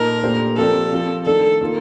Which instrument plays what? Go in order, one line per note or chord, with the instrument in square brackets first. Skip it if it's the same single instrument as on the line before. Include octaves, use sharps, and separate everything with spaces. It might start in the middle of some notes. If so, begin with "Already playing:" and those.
Already playing: [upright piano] A#2 D#4 A4 [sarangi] A#4
[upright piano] A#2 A3 D4 G4 C5
[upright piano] F3 C4 G4 A#4 D5 [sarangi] A4
[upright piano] F3 C4 F4
[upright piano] D#3 A3 D4 [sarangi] A4
[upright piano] D#3 A#3 F4